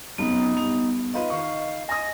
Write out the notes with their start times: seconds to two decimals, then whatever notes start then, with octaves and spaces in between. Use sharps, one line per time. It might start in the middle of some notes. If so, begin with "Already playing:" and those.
0.18 F1 B1 F#2 B3 D#4
0.57 G2 F7
1.14 D#4 F4 B4 D#5
1.30 D#3 F5 C#6
1.89 G#5 D#6 A#6